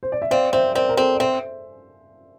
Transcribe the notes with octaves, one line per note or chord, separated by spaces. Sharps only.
C5
D5
E5
C4 D5 F5
C4 C5 E5
C4 A#4 D5
A#4
C4 A4 C5
D5
C4 C5 E5